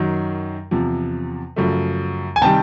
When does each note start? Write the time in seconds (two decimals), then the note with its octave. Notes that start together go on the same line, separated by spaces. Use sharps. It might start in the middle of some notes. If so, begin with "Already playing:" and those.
Already playing: F#2 D#3 F#3
0.71 E2 C3 F3
1.56 F#2 C#3 F3 A3
2.36 G#5
2.42 C3 D#3 G3 G5 A5